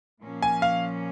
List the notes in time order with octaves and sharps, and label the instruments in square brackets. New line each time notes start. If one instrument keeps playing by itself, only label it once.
[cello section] A#2 F3 A#3 C#4
[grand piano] G#5
F5